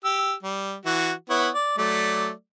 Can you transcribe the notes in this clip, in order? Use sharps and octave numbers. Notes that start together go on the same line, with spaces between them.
G4 E6
G3
E3 F#4
B3 E4 C#5
D5
F#3 A3 D5